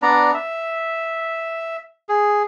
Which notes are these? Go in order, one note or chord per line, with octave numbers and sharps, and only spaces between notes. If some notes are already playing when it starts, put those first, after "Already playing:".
B3 D4 D5 A#5
E5
G#4